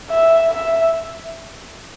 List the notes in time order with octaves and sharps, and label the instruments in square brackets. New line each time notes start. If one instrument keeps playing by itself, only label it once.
[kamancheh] E5
E5